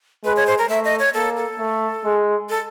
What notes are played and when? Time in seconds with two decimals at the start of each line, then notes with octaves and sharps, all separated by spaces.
0.25 G#3 B4
0.36 C#5
0.47 C5
0.58 A#4
0.69 A3 E5
0.85 D#5
0.99 C#5
1.14 A#3 A4
1.37 A4
1.59 A3
2.05 G#3
2.50 A4